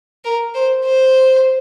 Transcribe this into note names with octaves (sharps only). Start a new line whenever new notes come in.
A#4
C5
C5